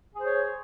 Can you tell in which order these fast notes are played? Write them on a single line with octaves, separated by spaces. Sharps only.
G#4 C5 C#5